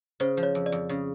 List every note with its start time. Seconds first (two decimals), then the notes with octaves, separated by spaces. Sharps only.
0.20 C#3 C5
0.37 F3
0.43 C#5
0.55 F2
0.66 D5
0.72 F2
0.89 C#3